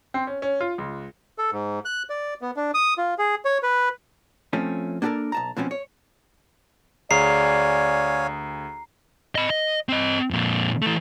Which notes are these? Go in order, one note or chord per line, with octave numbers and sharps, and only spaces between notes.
C4
C#4
C#4
F4
C#2
A4
G#2
F#6
D5
B3
D4
D#6
F4
G#4
C#5
B4
F3 A3 C4 C#4
A#3 D4 F#4 G4 A4 A#4
B1 A5 A#5
B2 F3 C4 C#4
C#5
D2 G#4 C#5 D5 F5 G#5 A#5 C7
D#5 B5
D#5
C4 D#5
F2 A#2
E3 A3